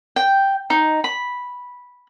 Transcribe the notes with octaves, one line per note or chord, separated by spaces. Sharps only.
G5
D#4
B5